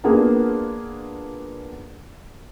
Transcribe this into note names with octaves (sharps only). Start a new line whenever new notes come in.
A#3 B3 D4 F4 G#4